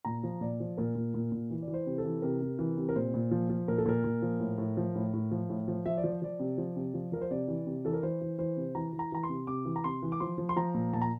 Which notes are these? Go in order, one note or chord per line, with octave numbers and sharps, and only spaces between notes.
A#2 A#5
F3
A#2 D5
F3
A#2 A#4
A#2
A#2
A#2
E3
D5
E3
C5
C3
A4
E3
C3 A#4
C3
E3
C3
A#4
A#2 C5
A#2
F3
F3
A#2 A#4
A4
A#2 A#4
A#2
F3
A2
A2
F3
A2
A2
F3
A2
F3
F3 E5
D5
F3
C5
F3 D5
C3
F3
C3
F3
F3 A#4
C5
C3 D5
E3
C3
E3 A4
A#4
E3 C5
E3
E3 C5
C3
E3 A#5
E3
A#5
E3 A#5
C6
C3
C3 D6
E3
A#5
C3 C6
E3
D6
F3 C6
F3
C6
F3 A#5
A#2
A#2 A5
A#5